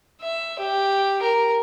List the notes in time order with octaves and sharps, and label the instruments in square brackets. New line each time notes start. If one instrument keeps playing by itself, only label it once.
[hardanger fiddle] E5
G4
A#4